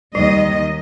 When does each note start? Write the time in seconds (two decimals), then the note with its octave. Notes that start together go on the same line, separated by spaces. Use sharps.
0.15 D#2 D#3 G3 D#5